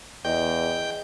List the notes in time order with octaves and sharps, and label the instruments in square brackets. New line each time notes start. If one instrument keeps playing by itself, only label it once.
[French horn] E2 [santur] G#4 D#5 [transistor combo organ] G5